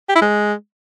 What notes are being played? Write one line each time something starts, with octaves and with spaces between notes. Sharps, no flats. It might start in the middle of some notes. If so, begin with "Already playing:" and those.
G4
E4
G#3